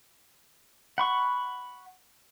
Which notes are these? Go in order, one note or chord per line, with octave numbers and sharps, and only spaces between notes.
F#5 B5 C#6